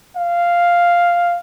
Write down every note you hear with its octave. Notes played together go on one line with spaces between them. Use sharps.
F5